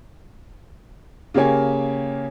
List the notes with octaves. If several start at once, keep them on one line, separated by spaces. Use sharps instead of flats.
C#3 A#3 G4 C#5 G#5